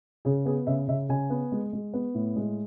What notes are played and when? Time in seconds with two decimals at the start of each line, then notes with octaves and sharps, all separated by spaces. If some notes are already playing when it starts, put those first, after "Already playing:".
0.25 C#3 G#4
0.46 B3 G#4
0.67 C#3 E5
0.88 C#3 E5
1.09 C#3 G#5
1.30 B3
1.52 G#3
1.73 G#3
1.94 B3
2.15 A2
2.36 G#3